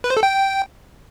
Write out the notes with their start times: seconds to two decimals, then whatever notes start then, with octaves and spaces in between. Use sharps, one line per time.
0.04 B4
0.10 C5
0.17 A4
0.23 G5